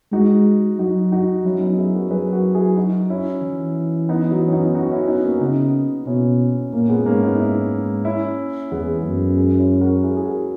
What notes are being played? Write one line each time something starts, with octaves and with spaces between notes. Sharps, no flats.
G#3 D#4 F#4
F#3 D#4 F#4
D#4 F#4
F#3 C#4 E4
B3 D#4
E4 G#4
F#4 A#4
F#3 G#4 B4
F#4 A#4
E4 G#4
D#4 F#4
C#4 E4
E3
B3 D#4
F#3
C#4
B3 D#4
D#4 F#4
F#4
C#4 E4
B3 D#4
A#3 C#4
C#3 B3 D#4
B2 C#4 E4
A#2 A#3 C#4
G#3 B3
G#2 A#3 C#4
B3 D#4
C#4 E4
C#4 E4
E2 G#3 B3
F#2 G#3
G#3
C#4 E4
F#4 A#4
E4 G#4
G#4
F#4 A#4